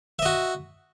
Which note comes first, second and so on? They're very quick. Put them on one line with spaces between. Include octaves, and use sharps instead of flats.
E5 D#5 F#4